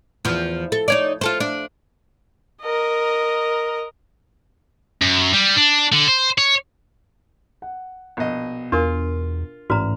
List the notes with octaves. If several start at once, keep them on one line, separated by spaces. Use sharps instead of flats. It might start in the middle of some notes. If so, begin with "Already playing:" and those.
E2 F3
A4
D#4 C#5 D5
F4 A4 C5
D4
A#4 D#5
F#2
G3
D4
D3
C5
C#5
F#5
A#1 B2 D#5
E2 D4 F4 A#4
A1 G#2 F#4 D5 A#5 F6